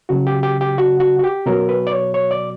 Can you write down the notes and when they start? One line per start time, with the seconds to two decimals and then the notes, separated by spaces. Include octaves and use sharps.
0.09 C#3 F#3 F#4
0.27 G4
0.43 G4
0.61 G4
0.78 F#4
1.00 F#4
1.19 F#4
1.24 G4
1.46 B2 F#3 A#4
1.69 B4
1.87 D5
1.92 C#5
2.14 C#5
2.31 D5